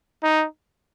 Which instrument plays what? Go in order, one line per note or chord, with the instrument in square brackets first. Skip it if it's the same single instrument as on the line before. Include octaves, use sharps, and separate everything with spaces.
[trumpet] D#4